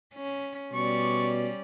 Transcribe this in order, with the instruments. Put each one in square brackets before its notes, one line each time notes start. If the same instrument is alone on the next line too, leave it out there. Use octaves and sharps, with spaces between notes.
[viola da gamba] C#4
[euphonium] B2 [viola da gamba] G3 C#4 D5 [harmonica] C#6